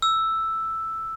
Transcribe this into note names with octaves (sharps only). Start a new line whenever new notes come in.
E6